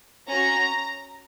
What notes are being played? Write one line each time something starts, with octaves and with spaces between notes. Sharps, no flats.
C#4 F#4 A#5